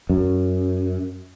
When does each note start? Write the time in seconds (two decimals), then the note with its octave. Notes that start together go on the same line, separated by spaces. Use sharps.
0.10 F#2